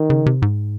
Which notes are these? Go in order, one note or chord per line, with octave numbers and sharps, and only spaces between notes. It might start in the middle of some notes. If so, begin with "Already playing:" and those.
Already playing: D#3
C#3
C3
G#2